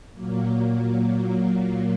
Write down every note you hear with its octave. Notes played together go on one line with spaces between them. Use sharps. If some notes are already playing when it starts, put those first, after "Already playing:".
A#2 F#3 A#3